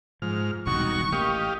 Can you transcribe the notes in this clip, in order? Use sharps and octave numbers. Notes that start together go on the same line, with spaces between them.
G#2 F3 F6
E1 C2 D#3 F#4 C#6
A1 A#3 G4 D#5 F5